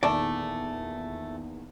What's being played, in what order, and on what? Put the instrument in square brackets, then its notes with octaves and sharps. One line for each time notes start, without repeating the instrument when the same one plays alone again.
[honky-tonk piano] E2 A#2 D#3 [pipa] A3 [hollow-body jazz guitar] D5 A5